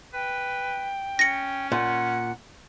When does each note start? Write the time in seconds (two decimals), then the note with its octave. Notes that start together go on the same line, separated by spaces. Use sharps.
0.14 B4 G5
1.19 C#4 A#6 C#7
1.72 A#2 F#5